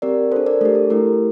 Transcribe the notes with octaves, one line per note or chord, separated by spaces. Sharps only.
C4 G4 A#4 D5
A4 C5
D4
A#4 D5
A3 D4 G4 A4
A4
A3 E4 G4 A#4